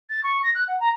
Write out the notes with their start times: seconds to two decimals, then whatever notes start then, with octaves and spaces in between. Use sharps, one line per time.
0.10 A6
0.24 C#6
0.43 A#6
0.55 F#6
0.68 F#5
0.80 A#5